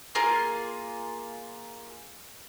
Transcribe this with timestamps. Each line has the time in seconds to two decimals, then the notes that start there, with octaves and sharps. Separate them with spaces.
0.15 A#3 F4 G#4